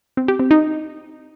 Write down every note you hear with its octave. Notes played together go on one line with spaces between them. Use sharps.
C4
G4
C4
D#4